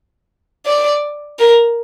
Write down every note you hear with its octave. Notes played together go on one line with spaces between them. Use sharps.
D5
A#4